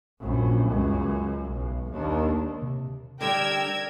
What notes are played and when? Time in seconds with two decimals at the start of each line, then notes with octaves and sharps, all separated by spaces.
0.20 A#1 F#2
0.69 C#2 F#2
1.49 B1
1.91 D#2 D4
2.62 C3
3.21 D3 G3 A#4 G5 E6 G#6